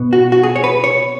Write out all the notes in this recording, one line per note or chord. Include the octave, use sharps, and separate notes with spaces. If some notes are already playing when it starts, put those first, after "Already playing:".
Already playing: B2 B3
F#4
F#4
G#4
C#5
B4
C#5